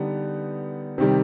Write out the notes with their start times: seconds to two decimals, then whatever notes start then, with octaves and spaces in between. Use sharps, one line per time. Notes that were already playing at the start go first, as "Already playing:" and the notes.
Already playing: D3 G3 B3 D#4
0.98 C3 D#3 G3